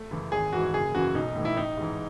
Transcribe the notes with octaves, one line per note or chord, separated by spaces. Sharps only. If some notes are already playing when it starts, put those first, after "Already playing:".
Already playing: A3
F#2 C#3 E3
G#1 G#4
G#2 E3 F#4
F#1 G#4
F#2 C#3 E3 F#4
B1 D#4
A2 E3
E4
A1 D#4
G#2 E3